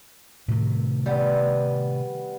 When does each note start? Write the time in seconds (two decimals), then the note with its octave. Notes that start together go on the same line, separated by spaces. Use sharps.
0.48 A2 C3 D#3
1.06 G3 B3